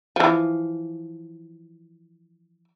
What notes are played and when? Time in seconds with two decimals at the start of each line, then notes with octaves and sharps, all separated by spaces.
0.16 E3 F3